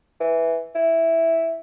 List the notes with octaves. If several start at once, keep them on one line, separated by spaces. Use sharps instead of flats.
E3
E4